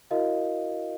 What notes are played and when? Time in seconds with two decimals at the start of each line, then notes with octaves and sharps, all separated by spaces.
0.11 E4 F#4 A#4 D#5 F5